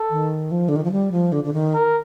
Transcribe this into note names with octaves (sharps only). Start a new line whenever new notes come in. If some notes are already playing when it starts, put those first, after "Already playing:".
Already playing: A4
D#3
F3
D3
D#3
F3
G3
F3
D3
D3
D#3
A#4